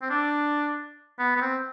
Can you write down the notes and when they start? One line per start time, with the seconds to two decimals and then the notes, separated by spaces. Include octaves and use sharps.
0.02 C4
0.10 D4
1.19 B3
1.36 B3
1.41 C4